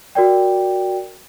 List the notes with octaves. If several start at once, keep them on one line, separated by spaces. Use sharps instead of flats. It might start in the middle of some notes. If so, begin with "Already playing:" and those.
F#4 A#4 D5 G5